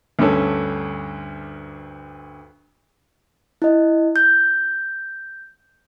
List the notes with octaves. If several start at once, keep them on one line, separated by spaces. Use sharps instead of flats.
D2 G2 D3 C#4 A4
E4 D#5
G6